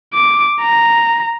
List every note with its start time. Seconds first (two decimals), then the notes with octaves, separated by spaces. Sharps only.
0.14 D6
0.62 A#5